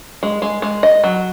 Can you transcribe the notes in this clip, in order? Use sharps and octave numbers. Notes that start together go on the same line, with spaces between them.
G#3
G#3
G#3
D#5
F#3